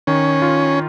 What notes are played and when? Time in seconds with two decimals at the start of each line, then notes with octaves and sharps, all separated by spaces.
0.07 D#3 C#4
0.42 F4